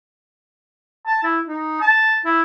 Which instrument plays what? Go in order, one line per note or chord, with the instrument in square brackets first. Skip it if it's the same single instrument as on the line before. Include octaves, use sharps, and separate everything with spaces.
[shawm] A5
E4
D#4
A5
E4